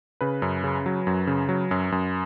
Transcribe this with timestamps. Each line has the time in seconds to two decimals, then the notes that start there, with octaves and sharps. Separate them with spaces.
0.21 C#3 B4
0.42 F#2
0.64 C#3
0.86 F#3
1.07 F#2
1.27 C#3
1.49 F#3
1.71 F#2
1.92 F#2